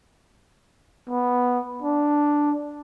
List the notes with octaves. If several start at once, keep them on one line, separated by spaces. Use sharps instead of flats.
B3
D4